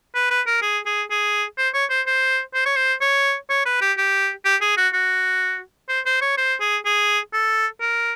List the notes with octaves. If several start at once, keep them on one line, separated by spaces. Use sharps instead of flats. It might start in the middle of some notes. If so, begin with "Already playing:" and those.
B4
B4
A#4
G#4
G#4
G#4
C5
C#5
C5
C5
C5
C#5
C5
C#5
C#5
B4
G4
G4
G4
G#4
F#4
F#4
C5
C5
C#5
C5
G#4
G#4
A4
A#4